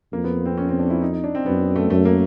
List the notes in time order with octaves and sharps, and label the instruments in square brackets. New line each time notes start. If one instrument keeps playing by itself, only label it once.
[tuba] F2 [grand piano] A#3
[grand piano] B3
C4
C#4
C4
D4
E4
D#4
D#4
D4
C4
[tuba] F#2 [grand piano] B3
[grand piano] A3
[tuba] F#2 [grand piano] A3
[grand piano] A#3